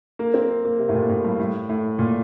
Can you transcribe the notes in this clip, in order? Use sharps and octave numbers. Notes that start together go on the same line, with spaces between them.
A#3
C4
A#3
C3
A2
A#2
A2
G2
A2
A2
A#2